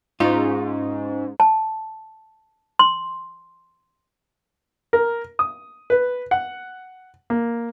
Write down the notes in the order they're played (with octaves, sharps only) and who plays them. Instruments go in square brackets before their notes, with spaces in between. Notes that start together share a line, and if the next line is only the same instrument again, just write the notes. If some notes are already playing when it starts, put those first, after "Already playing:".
[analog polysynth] G#2 [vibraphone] C#4 [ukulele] D#4 [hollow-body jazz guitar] F4
[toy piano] A5
C6
[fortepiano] A#4
D#6
B4
F#5
A#3